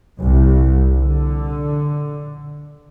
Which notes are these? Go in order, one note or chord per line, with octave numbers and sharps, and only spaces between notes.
C2
D3